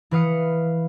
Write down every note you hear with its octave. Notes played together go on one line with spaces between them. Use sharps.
E3 B4 F5 D#6 C#7